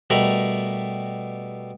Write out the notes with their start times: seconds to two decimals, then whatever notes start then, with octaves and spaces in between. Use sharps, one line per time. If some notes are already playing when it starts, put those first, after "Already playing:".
0.10 B2 G3 A3 A#4 A#5 B5